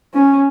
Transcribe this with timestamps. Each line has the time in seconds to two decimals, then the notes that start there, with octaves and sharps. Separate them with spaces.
0.14 C#4